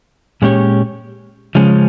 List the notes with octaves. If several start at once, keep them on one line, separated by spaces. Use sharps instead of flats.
A#2 G#3 C#4 G4 C#5
C#3 F3 G#3 C#4